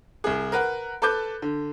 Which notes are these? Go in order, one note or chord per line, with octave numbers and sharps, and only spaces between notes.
C2 G#4
A#4 B4 F#5
A4 B4 A5 D6 G6
D3